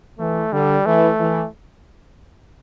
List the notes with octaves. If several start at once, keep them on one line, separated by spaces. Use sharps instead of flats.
E3 A3
D3 G3
E3 A3
E3